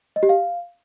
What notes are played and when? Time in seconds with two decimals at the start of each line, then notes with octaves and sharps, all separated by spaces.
0.16 D#5
0.23 G4
0.29 F5